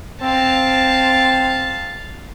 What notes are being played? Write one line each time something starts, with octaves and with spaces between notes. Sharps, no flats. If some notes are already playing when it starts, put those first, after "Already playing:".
C4 F5 A5